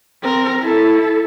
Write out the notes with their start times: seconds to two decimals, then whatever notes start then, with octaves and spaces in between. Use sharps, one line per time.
0.23 C4 A#4
0.61 E4 A4